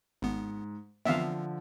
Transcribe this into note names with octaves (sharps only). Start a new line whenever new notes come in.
G#1 G#2 B3
D3 E3 F3 B3 C4 E5 F5